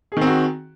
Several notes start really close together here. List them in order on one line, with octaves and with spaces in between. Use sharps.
G#4 D#3 C4 F#4